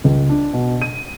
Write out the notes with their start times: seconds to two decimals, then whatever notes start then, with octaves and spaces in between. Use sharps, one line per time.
0.04 C#2
0.29 D4
0.53 B2
0.82 D#7